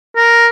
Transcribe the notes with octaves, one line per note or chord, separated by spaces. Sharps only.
A#4